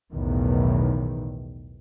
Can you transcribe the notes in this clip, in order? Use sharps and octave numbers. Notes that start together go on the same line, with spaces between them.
B1 E2 A2 D#3